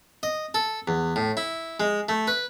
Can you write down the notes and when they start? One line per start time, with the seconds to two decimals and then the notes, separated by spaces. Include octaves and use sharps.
0.23 D#5
0.54 A4
0.88 E2
1.16 A2
1.37 E4
1.80 G#3
2.09 A3
2.27 B4